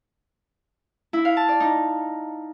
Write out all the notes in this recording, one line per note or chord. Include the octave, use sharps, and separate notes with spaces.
E4
F5
A5
D5
D#4